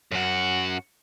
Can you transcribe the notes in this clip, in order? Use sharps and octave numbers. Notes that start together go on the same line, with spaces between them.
F#2 F#4